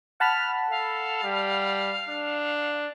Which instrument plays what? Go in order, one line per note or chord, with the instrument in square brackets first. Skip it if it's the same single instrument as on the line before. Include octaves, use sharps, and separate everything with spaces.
[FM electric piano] F#5 A5 B5 [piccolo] F6
[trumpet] A4 [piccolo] F5
[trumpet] G3
D4